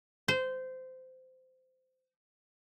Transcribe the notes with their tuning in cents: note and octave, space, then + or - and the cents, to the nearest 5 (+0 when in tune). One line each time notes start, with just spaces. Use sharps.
C5 -20